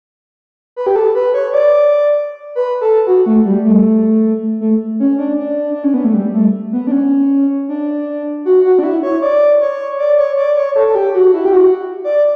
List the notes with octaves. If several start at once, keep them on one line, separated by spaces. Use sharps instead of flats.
B4
G4
A4
B4
C#5
D5
B4
A4
F#4
A3
G3
A3
A3
C#4
D4
D4
D4
C#4
B3
A3
G3
A3
B3
D4
C#4
D4
F#4
F#4
D4
E4
C#5
D5
C#5
D5
C#5
D5
C#5
A4
A4
G4
F#4
E4
G4
F#4
D5